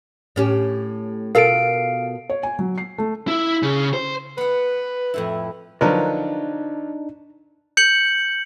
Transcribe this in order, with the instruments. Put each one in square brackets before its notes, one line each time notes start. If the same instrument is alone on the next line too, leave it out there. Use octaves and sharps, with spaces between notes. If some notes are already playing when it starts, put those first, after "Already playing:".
[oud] A2 C#4 G4
[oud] B2 F4 A4 [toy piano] A#4 [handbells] F5 D7
[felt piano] C#5
G#5
F#3
C7
A3
[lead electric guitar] E4
C#3
C5
[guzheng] B3 F#5 [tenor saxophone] B4
[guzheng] F2 A2 E4
[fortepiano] D3 F3 F#3 [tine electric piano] D4 D#4 [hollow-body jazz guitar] A#4 B4 A#5
[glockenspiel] G6 C#7 F#7